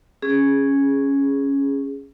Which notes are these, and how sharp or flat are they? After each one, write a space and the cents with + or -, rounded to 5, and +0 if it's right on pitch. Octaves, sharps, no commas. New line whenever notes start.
C#4 +0 G#4 +0